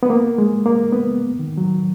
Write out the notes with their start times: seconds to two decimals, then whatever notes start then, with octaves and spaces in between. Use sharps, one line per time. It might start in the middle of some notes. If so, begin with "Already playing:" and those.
0.03 B3
0.10 A#3
0.38 G#3
0.66 A#3
0.92 B3
1.39 D#3
1.57 F#3